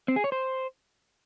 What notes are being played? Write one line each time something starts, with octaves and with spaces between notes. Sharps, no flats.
C4
G#4
C#5
C5